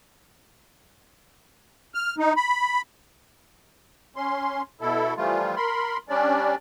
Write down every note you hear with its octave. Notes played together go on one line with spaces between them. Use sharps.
F6
D#4
B5
C#4 C6
B2 E4 A4
E3 F3 G3 A3 F4
A#4 B5 C6
G3 C#4 D4 D5